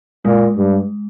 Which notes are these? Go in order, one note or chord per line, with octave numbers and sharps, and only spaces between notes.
A#2 G#3
G2